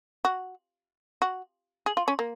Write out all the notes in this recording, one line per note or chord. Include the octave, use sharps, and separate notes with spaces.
F#4
F#4
G#4
F4
C#4
A#3